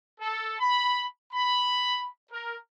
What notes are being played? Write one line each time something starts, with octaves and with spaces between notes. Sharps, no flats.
A4
B5
B5
A#4